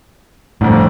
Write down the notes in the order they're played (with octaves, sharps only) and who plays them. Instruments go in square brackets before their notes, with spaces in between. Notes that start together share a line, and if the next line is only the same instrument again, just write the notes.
[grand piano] G1 F2 [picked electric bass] A2